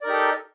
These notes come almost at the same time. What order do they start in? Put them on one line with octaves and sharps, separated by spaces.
D5 A#4 D#4 G4 A4